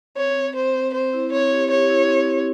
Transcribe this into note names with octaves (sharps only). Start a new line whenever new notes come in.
C4 C#5
C4
C4 C5
C4
C4 C5
E4
C4 C#5
G4
G4 C#5
E4
C4
C4